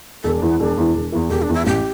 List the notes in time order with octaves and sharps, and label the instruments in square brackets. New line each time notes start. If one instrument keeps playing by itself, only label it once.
[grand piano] E1 [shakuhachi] A4
[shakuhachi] D4
[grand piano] E2 E3
[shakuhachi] B3
[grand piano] E1 [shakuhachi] D4
[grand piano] E2 E3
E1
E2 E3
[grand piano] E1 [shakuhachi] G4
[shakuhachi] D4
[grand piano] E2 E3
[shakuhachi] E4
[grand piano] A1 [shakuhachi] G4